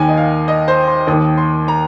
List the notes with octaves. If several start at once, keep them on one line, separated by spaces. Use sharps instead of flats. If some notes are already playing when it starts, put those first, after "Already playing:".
Already playing: D#2 D#3 G#5
D#5
F5
D#5
C5
C6
D#2 D#3 D#6
C6
A#5